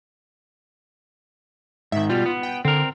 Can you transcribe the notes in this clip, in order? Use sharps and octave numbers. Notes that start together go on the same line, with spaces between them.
G#2 D#3 E5
B2 G3 F4
B3
G5
D3 C4 A#4